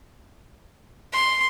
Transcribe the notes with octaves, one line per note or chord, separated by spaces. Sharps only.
C6